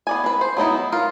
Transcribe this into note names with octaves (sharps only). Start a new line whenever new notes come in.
B3 D5 G#5
C4 B4
C5
F#3 B3 D#4 E4
F4 A#4